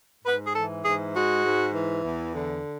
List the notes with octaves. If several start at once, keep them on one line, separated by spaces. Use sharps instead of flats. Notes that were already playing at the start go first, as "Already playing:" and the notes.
G#2 B4
G#4
E3 A4
G#2 G#4
G#3 F#4
G#2
E3
E2
D3